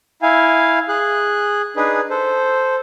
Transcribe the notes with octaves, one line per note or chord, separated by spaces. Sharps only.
E4 F5 G#5
G#4 F#6
D4 D#4 G#4 B4
A4 C5